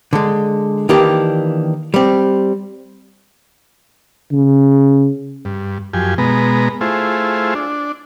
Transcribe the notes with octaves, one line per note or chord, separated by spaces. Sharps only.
D3 G#3
D#3 E3 A#3 D4 G4
G3 C4
C#3
G2
F#2 F3 G4 G#5
B2 G#3 B3 A#5
A3 E4 F4 G#4 C5
D4